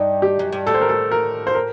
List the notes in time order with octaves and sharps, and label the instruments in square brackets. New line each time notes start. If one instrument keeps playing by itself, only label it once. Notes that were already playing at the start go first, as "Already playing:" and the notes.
Already playing: [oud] G2 [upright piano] D#4
[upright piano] G4
[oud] F#2
G2
[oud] A2 [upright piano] A4
[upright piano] C5
A#4
A4
A#4
C5
A#4